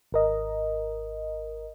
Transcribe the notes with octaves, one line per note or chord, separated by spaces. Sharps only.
G#1 A#4 D#5